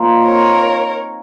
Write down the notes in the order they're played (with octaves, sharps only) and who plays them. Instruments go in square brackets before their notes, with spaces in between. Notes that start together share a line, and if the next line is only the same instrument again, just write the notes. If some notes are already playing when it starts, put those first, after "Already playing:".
Already playing: [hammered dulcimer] A#2 F3 A#3 C4 D#4 F4
[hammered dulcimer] C4 [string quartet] A#4 C#5